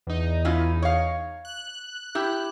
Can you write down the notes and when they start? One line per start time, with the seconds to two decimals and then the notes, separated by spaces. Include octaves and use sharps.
0.07 E2 D#4
0.45 C#4 E4 F4
0.82 C#5 F5
1.45 F#6
2.15 E4 G4